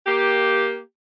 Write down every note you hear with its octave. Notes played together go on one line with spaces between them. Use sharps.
A#3 G4